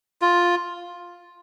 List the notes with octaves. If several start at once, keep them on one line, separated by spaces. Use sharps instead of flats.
F4